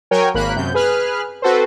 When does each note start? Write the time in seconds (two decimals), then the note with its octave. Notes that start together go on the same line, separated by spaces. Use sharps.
0.11 F#3 A#4 C#5 G5 G#5
0.34 G#1 A#3 B5 F#6
0.56 F#2 C3 G6
0.74 G#4 B4 F6 F#6
1.42 C4 F#4 A4 B4 C5